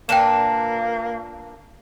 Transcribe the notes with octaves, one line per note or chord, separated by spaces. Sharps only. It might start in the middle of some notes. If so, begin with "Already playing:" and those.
A#2 A#3 D4 B4 G5 E7